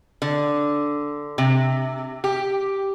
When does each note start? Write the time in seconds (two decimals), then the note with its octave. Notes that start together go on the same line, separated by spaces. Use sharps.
0.22 D3
1.38 C3
2.24 G4